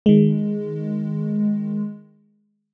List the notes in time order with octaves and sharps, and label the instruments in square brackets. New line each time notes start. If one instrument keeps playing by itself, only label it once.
[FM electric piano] D#3 G#3